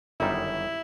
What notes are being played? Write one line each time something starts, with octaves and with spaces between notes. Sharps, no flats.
G1 F#2 D#3 G3 D#4 E4